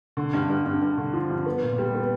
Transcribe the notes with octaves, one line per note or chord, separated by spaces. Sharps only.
D3
G2
G2
G2
G2
D3
F3
G2
B3
A#2
G3
B3